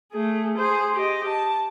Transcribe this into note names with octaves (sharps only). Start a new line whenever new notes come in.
A3 G#4
G#4 C5
G4 D#5
A5